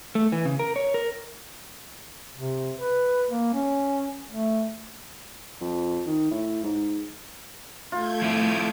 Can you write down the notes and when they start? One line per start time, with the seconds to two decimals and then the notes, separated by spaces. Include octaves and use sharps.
0.15 A3
0.32 E3
0.45 C#3
0.59 A#4
0.76 C#5
0.94 A#4
2.35 C3
2.78 B4
3.29 A#3
3.54 C#4
4.31 A3
5.61 F2
6.06 D#3
6.31 A2
6.63 G#2
7.92 A3 F4 G6 G#6
8.22 F3 C4 E4